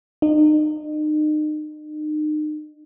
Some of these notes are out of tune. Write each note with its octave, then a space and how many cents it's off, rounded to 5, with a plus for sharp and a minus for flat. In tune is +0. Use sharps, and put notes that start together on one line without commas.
D#4 -35